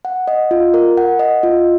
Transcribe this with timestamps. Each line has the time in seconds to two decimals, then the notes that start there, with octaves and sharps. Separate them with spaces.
0.05 F#5
0.28 D#5
0.51 F4
0.74 A#4
0.97 F#5
1.19 D#5
1.43 F4